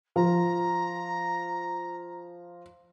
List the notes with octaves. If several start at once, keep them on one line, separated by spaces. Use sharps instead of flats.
F3 A#5